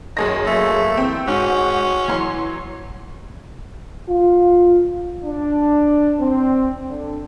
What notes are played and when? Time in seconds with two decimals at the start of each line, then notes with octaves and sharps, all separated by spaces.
0.17 F#2 D#3 G#4 A#6
0.46 A3 A#3
0.97 E3 C4
1.27 G#2 C#4 F#4
2.08 E3 F#3 C6
4.08 F4
5.24 D4
6.20 C4
6.89 D3